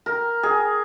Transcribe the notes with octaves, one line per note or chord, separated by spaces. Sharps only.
A#4
G#4